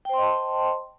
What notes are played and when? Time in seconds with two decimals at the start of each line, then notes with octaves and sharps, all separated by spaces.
0.05 G5
0.09 C5
0.14 C6
0.18 D#5
0.22 A5